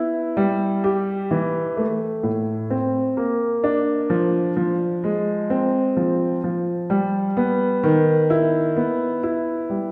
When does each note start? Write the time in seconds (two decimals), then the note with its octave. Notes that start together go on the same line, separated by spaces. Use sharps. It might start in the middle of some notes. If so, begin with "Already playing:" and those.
Already playing: B3 E4
0.37 G3
0.84 G4
1.31 E3
1.77 A3
2.23 A2
2.70 C4
3.17 A#3
3.64 D4
4.10 F3
4.57 F3
5.04 G#3
5.50 C4
5.97 F3
6.44 F3
6.90 G3
7.37 B3
7.84 D#3
8.30 E4
8.76 B3
9.23 E4
9.70 G3